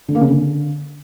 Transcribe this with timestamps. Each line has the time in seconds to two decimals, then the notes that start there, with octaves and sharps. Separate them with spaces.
0.09 D3
0.15 A#3
0.21 C#3
0.28 D3